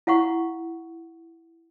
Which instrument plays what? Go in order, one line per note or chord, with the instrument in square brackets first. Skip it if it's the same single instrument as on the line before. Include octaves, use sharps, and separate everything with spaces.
[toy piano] E4 F5 F#5 C#6